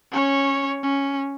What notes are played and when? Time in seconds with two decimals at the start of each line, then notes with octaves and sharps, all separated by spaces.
0.12 C#4 C#5
0.83 C#4